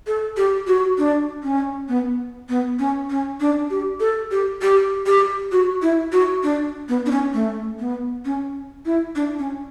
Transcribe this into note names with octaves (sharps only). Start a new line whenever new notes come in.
A4
G4
F#4
D4
C#4
B3
B3
C#4
C#4
D4
G4
A4
G4
G4
G4
F#4
E4
F#4
D4
B3
D4
C#4
A3
B3
C#4
E4
D4
C#4